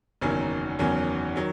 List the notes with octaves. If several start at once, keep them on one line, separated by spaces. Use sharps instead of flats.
F#1 E2 D#3 F#3 C#4
F#1 E2 D#3 F#3 C#4
D#3 F#3